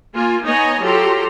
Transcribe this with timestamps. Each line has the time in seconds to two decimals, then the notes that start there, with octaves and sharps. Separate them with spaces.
0.14 A#3 F4 G#5
0.46 B3 D#4 C#5 D#5 G#5 A#5
0.83 F#3 F4 G4 A4 A#5 C6